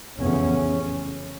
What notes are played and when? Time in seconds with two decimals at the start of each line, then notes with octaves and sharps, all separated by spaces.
0.19 F1 E2 C#3 C#4